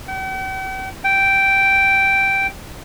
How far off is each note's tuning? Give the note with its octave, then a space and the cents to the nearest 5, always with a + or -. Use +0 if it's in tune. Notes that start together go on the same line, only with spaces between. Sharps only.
G5 -45
G5 -5